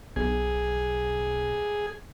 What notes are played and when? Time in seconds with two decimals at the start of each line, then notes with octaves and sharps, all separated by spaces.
0.16 B1 G#4